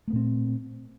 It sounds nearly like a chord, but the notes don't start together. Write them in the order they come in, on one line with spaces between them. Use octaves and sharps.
A3 B3 A#2 C4